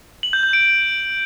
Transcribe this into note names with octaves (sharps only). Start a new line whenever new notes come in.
F#7
G6
G6
D7